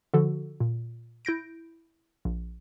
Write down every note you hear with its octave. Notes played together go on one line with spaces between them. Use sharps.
D3 F3 F#4 A4
A#2
E4 G6 A#6 D7
A#1